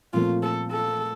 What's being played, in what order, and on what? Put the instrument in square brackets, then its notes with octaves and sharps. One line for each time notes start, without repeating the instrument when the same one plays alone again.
[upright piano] A#2 F3 A3 C4 [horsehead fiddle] F4
[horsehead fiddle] A4
A4